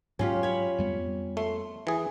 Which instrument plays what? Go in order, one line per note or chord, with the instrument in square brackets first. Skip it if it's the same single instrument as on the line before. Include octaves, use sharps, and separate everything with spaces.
[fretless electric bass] G#2 F#3 [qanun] C#4 F4 G4
[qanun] C#5 B5
[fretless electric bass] F2 G3 B3
[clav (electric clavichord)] A3 [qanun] C6
[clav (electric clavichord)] E3 G#4